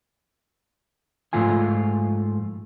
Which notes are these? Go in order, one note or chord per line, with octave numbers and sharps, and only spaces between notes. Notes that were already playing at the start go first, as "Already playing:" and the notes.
G#2 F3 A3 F4 G#5